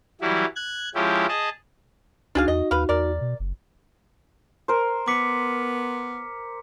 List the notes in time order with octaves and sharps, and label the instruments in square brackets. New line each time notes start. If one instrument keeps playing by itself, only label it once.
[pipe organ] E3 F#3 G3 E4
F#6 G#6
F3 G#3 C#4 E4 G4
G#4 D#5 A5
[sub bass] C#2 [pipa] D4 G#4 F5 [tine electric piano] D#4 F#4
[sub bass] E2 [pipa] D#5
[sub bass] D#2 [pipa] B4 F5
[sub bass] E2 [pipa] A#4 D5
[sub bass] B2
F#1
[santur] A#4 C5
[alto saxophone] B3 [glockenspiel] D6 B6 C#7